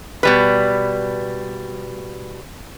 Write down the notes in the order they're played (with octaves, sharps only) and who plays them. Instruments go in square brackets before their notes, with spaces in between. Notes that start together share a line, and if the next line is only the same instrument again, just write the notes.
[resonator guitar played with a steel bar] B2 G3 B4